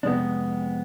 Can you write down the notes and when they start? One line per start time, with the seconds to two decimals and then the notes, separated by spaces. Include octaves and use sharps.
0.03 F2 C3 G#3 B3 D4